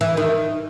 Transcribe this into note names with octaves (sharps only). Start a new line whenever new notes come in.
E3
D#3